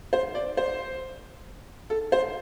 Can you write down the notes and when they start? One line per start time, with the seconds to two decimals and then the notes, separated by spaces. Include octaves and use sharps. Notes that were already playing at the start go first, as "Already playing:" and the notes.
0.13 C5
0.35 D5
0.57 C5
1.90 A4
2.12 C5